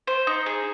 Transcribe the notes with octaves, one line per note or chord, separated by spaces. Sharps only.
C5
D#4
G#4